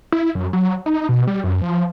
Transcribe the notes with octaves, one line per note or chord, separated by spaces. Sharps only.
E4
F#2
F#3
D#4
B2
G3
F#2
F3